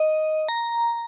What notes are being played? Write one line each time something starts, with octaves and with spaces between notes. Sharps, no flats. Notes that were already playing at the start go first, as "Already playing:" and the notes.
Already playing: D#5
A#5